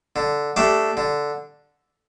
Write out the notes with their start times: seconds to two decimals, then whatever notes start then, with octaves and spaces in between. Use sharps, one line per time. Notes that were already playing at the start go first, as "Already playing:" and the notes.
0.16 D3
0.56 A3 D4 G4
0.97 D3